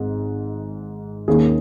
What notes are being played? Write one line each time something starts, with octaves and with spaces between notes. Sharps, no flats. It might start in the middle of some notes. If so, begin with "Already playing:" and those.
Already playing: G#1 G#2
D#2 D#3 A#3 C#4 G#4